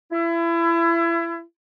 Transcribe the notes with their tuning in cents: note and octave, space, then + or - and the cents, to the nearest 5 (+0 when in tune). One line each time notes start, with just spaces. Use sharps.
E4 +30